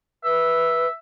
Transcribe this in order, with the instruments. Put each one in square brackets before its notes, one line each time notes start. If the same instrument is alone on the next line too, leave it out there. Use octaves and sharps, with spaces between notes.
[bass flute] B4 [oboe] E5